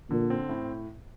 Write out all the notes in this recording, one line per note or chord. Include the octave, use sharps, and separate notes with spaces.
A#2 D3
C4
A2